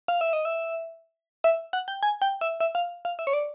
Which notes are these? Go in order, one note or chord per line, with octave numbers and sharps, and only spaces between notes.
F5
E5
D#5
E5
E5
F#5
G5
G#5
G5
E5
E5
F5
F5
E5
C#5
D5